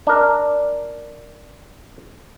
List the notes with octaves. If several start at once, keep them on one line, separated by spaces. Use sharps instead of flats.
D4 A#4